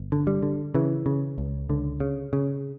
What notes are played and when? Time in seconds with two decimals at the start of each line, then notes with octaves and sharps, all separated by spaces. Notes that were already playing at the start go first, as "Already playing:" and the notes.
Already playing: G1
0.12 D3
0.27 G3
0.43 D3
0.75 C#3 E3
1.06 C#3
1.38 C#2
1.69 C#2 D3
2.00 C#3
2.33 C#3